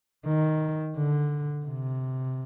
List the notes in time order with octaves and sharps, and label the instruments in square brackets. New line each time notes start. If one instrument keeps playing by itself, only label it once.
[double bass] D#3
D3
C3